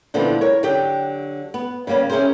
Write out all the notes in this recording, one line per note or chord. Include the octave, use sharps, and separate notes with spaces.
A#2 D3 E3 F3 G3 B3
A#4 C#5
D3 F#3 G4 G5
B3
C#3 G3 A#3 B3 C#4
C#4 E4 G4 G#4 A#4 C5